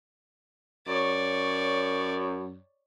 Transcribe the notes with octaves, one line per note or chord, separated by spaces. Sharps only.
F#2 C#5 D5